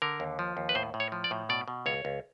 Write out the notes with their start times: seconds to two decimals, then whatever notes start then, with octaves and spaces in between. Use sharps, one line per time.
0.02 D3 A#4
0.20 D#2
0.39 F3
0.57 D#2
0.69 B4
0.75 A2 C5
0.94 A2
1.00 C#5
1.12 F3
1.24 D5
1.31 A2
1.49 B2 D5
1.68 B2
1.86 C#2 C#5
2.05 C#2